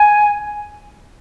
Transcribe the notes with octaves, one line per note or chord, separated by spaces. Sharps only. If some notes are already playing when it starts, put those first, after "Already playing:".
Already playing: G#5